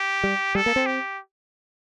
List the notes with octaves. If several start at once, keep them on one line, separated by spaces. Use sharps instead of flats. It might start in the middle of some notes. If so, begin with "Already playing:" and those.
Already playing: G4
G3
G3 A4
A#3
C4
G4